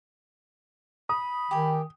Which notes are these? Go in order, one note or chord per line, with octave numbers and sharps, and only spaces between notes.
B5 D#6
D#3 G4 G#5